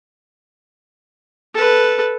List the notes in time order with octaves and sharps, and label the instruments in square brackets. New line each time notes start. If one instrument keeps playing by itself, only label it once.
[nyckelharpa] A4 B4